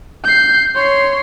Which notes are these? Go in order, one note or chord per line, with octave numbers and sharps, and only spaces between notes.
G6 C7
C#5 C6